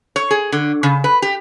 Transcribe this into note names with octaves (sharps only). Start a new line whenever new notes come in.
C#5
G#4
D3
C#3
B4
G4